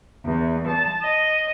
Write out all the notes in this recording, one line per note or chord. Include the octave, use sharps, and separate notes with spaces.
E2
A5
D#5